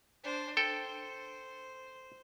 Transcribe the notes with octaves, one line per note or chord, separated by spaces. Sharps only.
D4 C5
A4 C5 G5